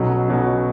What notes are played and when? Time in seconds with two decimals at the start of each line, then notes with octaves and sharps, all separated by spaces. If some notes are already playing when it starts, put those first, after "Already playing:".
Already playing: B1 B2 F#3 C#4
0.28 B1 B2 F#3 C#4